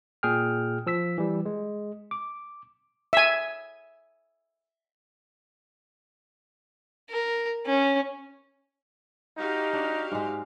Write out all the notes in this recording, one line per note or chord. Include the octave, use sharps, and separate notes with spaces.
A#2 G#4 G5 F6
F3 E6 B6
E3 G3
G#3
D6
E5 G#5
A#4
C#4
D#4 F#4 G4 F5
D4
G#2 G#3